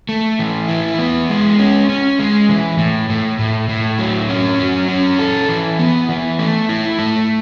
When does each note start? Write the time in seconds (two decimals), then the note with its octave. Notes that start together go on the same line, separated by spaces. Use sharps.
0.09 A3
0.39 E3
0.69 E4
0.99 B3
1.29 G#3
1.59 C#4
1.89 C#4
2.19 G#3
2.49 E3
2.78 A2
3.10 A2
3.39 A2
3.69 A2
3.99 F#3
4.29 C#4
4.59 F#3
4.88 C#4
5.19 A4
5.49 E3
5.79 B3
6.09 E3
6.39 A3
6.69 E4
6.99 A3